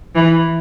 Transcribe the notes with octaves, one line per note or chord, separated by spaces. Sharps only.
E3